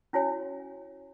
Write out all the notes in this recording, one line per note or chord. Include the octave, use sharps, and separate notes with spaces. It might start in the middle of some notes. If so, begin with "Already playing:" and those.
C#4 E4 F#4 C#5 G#5